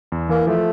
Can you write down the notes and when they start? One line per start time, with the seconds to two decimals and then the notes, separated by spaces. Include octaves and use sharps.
0.12 E2
0.29 E3 A#3
0.47 F3 A3